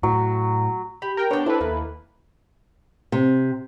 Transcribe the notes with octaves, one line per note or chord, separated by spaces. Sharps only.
A2 F#3
G4 B5
A#4 G5
B3 D4 C#5 G5
E4 A4 B4 C5
D#2 A#3
C3